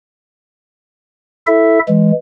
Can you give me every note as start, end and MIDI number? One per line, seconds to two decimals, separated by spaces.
1.47 1.79 64
1.47 1.79 69
1.47 1.79 76
1.88 2.12 52
1.88 2.12 56